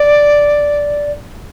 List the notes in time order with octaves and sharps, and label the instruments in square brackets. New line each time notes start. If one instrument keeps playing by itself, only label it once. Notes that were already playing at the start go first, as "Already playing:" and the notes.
Already playing: [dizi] D5